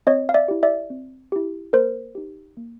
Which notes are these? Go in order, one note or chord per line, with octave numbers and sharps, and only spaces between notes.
C4 C#5 D#5
F5
D5 E5
E4 G4
D5 E5
C4
E4 G4
A#3 A#4 C5
D#4 G4
A#3